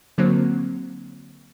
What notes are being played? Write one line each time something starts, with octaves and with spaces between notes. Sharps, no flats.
D3 F#3 A#3 C4